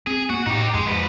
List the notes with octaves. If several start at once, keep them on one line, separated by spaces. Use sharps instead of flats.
C4 G#4
A#3 B3 F#4
A2 D#4 G4
F2 G#3
G#2 B4